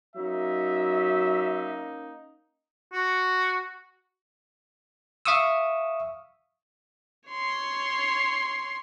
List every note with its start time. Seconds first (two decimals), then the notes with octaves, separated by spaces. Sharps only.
0.16 F#3 A#3 C#4 D#4 E5
2.93 F#4
5.26 E5 F5 C#6 D#6 E6
7.29 C#5 C6